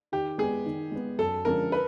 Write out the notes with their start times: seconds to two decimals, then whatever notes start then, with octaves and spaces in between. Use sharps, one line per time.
0.12 D#3 G4
0.38 G#3 B3 G#4
0.66 D#3
0.91 G#3 B3
1.19 F#2 A4
1.45 D3 F3 G#3 C#4 A#4
1.72 B4